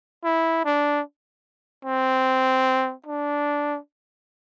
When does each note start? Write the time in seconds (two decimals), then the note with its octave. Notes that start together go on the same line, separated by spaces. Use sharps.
0.24 E4
0.65 D4
1.85 C4
3.06 D4